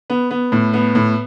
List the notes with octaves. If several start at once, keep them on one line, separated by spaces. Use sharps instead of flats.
B3
B3
A2
B3
A2